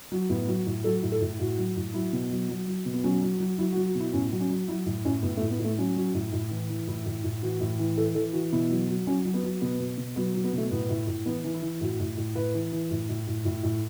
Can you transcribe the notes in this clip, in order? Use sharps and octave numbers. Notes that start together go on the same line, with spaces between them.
F#3
A2 B3
F#3
A2
F#3 A4
A2
A4
A2
A2 F#4
F#3
A2
F#3 E4
B2
F#3
F#3
F#3
B2
B3
F#3 C#4
F#3
F#3
F#3 E4
F#4
F#3
F#4
B2 E4
A2 C#4
F#3
C#4
F#3
F#3 E4
A2
A2 C#4
A2 B3
A3
A2
B3
A2 A3
F#3 C#4
F#3
A2
A2
E3
E3
A2 E4
A2
A2
E3 F#4
A2
E3
E3 A4
E3 A4
E3 F#4
B2 E4
F#3
F#3
F#3 C#4
F#3
B3
F#3
B2 B3
B2
B2
F#3 B3
F#3
B3
B2 A3
A2 B3
A2
A2
E3 B3
E3
E4
E3
A2 F#4
A2
A2
A2 B4
E3
E3
A2
A2
A2
A2
A2